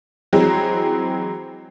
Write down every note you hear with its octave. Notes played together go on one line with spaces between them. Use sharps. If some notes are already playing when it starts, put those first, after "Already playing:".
E3 F#3 G#3 C4 G#4